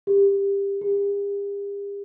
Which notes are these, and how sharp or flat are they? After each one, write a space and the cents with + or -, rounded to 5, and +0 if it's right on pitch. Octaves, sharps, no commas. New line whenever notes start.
G4 +20
G4 +45